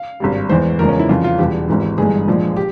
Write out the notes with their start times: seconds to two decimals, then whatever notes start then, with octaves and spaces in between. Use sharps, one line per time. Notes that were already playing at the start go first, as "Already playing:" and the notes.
Already playing: F5
0.20 G#1 G2 G3
0.49 E2 E3 G#3 C5
0.79 E2 C#3 F3 G#3 A#4
0.89 C#4
0.99 E4
1.09 F2 C#3 E3 F4
1.24 F4
1.38 E1 E2 E3 G3 G4
1.69 G#1 G#2 E3
1.98 G1 G2 E3 G#3 G#4
2.28 A#1 A#2 F3 G#3
2.57 G4